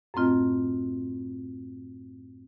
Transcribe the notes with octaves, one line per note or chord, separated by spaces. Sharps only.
F#2 A2 A3 C4 F4 D#5